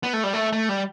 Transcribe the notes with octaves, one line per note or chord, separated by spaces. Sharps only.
B3
A3
G3
A3
A3
G3